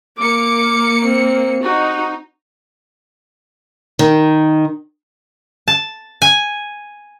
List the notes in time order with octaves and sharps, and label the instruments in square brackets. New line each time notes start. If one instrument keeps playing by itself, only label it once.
[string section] A#3 C#7 [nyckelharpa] D6
[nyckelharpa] C4
[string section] D#4 [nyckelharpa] F#4
[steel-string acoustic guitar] D#3
[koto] A5
G#5